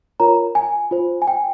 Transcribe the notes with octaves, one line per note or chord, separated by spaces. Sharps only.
F4 A#4 C#5 A#5
G#5
F4 C5
G#5
G5